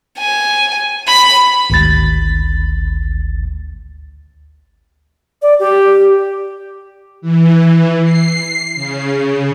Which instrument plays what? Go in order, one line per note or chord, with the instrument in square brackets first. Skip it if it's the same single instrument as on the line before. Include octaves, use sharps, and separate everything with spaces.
[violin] G#5
B5
[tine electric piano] G#1 D2 A6
[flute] D5
G4
[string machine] E3
C7
C#3